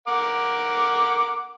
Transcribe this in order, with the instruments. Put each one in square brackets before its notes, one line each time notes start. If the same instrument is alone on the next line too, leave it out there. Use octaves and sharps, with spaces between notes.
[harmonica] A#4 F#5 D6